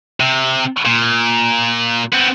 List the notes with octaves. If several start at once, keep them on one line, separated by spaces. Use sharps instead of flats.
C3
A#2
B3 C4